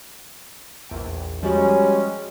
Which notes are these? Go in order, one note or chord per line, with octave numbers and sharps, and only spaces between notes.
A#1 E2 G5
F3 G3 G#3 C#4 F#4